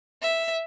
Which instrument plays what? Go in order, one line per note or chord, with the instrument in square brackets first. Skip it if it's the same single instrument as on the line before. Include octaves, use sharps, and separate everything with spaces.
[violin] E5